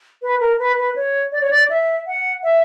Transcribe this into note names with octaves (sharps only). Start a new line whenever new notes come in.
B4
A#4
B4
B4
C#5
D5
C#5
D5
E5
F#5
E5